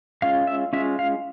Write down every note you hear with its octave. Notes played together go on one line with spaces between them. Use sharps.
G#3 C#4 F4 F5
E5
G#3 C#4 F4 E5
F5